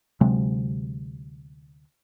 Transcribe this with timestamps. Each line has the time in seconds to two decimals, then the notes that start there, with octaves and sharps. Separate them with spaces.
0.21 D2 C3 F#3 G#3